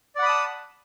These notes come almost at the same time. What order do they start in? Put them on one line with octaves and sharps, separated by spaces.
D5 F#5 B5 D#6 A5